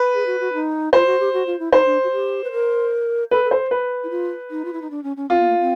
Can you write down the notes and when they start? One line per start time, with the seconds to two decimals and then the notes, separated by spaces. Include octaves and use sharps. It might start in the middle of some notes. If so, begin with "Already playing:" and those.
Already playing: B4
0.14 G#4
0.26 F#4
0.40 F#4
0.53 D#4
0.93 F4 C5
1.06 F#4
1.20 G4
1.33 F#4
1.47 F4
1.59 E4
1.72 D#4 C5
1.86 D4
2.04 F#4
2.12 G4
2.44 B4
2.52 A#4
3.31 A4 B4
3.45 A4
3.51 C5
3.71 B4
4.04 E4
4.10 F4
4.51 D#4
4.65 F4
4.73 E4
4.82 D#4
4.90 D4
5.03 C#4
5.17 C#4
5.30 C4 F4
5.40 B3
5.49 A#3
5.60 C4